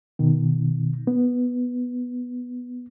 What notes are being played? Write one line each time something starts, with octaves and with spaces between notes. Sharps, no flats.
B2 D#3
B3